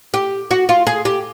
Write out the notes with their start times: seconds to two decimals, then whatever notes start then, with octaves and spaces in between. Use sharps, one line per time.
0.14 G4
0.51 F#4
0.69 F4
0.87 G#4
1.05 G4